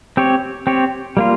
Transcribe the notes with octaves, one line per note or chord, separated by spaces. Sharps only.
C4 G4 C#5
C4 G4 C#5
G3 A#3 F4